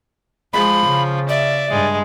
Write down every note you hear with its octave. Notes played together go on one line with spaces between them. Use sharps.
F3 G#3 B5
C#3
D5 E5
G2 G#3